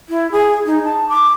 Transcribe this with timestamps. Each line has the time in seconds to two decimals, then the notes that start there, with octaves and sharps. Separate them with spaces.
0.09 E4
0.32 G#4
0.66 D#4
0.85 A5
1.09 D6